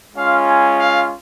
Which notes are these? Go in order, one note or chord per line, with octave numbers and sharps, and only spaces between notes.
G#3 C#4 F4 F5
G#5
F5